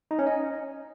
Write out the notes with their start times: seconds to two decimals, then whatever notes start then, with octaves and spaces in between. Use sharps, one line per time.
0.11 D#4
0.19 C#4
0.27 D#5